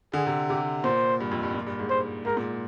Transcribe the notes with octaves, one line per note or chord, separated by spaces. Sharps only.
D3 G#4
C3
C3 G4
A#2 C5
G2
F2
G2
A#2
G2
G#2
G#2 C5
G#2 A#4
A#2